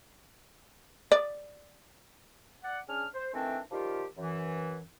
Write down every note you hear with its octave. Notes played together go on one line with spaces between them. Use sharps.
D5
D5 F#5
C#4 D4 G#4 F6
C5
D#3 E3 A3 C4 D4
D#3 F3 G3 F4 G4
F#2 E3